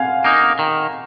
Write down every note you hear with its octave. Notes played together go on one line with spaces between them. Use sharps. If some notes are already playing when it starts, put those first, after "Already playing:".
Already playing: F5 F#5 G#5
A#3 D#4
D#3